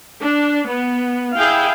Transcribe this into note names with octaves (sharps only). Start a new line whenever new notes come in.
D4
B3
E4 G#4 F5 G5